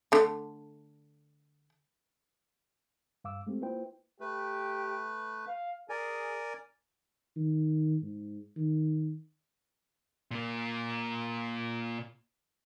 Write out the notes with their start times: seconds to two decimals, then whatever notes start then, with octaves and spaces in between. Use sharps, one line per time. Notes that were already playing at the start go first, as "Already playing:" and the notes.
0.12 D3 A3
3.24 G2 F5 D6 E6
3.47 G#3 A3 C4 G4
3.62 A#3 E4 F4 B4 C5 G5
4.20 A3 G4 B4
5.48 F5
5.89 G#4 A#4 D5 G#5
7.37 D#3
8.02 G#2
8.56 D#3
10.31 A#2 A#3